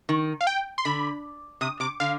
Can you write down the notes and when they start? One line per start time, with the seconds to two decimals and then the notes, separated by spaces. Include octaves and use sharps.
0.09 D#3
0.41 F5
0.47 G5
0.78 C6
0.85 D3 B5
1.61 C3 D#6
1.80 C3 D6
2.00 D3 F5